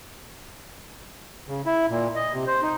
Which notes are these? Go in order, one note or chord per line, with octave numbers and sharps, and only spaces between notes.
C#3
E4
A#2
D#5
C3
C5
D#4